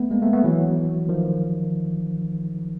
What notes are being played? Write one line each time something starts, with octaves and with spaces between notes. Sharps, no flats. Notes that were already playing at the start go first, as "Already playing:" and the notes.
Already playing: A3 B3
G#3 A#3
A3 B3
A3 B3
E3 F#3
D#3 F3